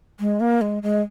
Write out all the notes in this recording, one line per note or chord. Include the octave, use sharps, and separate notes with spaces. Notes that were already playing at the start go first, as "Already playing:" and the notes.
G#3
A#3
G#3
G#3